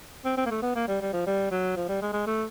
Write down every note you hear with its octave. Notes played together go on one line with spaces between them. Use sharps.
C4
C4
A#3
A3
B3
A#3
G3
G3
F3
G3
F#3
F3
G3
G#3
G#3
A3